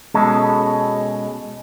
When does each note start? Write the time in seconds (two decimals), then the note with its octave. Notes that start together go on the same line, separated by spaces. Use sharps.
0.14 B2 G#3 C#4 A4